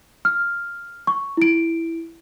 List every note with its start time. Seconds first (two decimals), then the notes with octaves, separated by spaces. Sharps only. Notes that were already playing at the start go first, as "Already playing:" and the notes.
0.25 F6
1.07 C#6
1.37 E4 D7